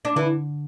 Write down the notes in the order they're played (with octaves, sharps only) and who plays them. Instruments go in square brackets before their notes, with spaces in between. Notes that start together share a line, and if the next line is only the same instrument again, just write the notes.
[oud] D4
[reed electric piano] D3 [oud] E3 E4